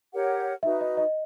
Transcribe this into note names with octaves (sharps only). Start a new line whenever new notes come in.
G4 A#4 C#5 F#5
D#4 F#4 B4 E5
D#5
D#5